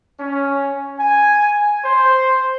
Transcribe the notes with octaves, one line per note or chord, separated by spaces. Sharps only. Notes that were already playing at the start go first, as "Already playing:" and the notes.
C#4
G#5
C5